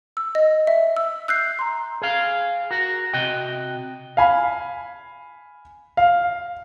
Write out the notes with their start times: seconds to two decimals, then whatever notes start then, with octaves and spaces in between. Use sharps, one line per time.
0.17 E6
0.35 D#5
0.67 E5
0.97 E6
1.28 E6 F#6 G6 C7
1.59 A#5 C6
2.02 G#4 F5
2.71 F#4 A#4
3.13 C3 F#4 D#5 G5
4.17 F5 G#5 B5
5.97 F5